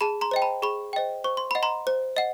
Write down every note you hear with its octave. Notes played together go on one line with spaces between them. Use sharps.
G#4 A5 B5
A#5 C6
C5 D#5 G5
A5 B5
G#4 B5 C#6
C5 D#5 G5
C5 C#6
C6
D#5 F#5 B5
A#5 C6
C5
D#5 F#5